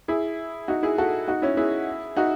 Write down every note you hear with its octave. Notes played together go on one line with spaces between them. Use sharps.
E4 G#4
D#4 F#4
E4 G#4
F#4 A4
D#4 F#4
C#4 E4
E4 G#4
D#4 F#4